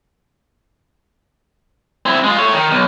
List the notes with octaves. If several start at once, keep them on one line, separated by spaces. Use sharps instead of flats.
C4 E4
G#3 F4
A3 C#5
D#3
B1